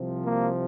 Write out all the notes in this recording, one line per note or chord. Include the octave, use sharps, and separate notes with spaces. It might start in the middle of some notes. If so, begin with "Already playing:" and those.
Already playing: C2 C3 F3
A#3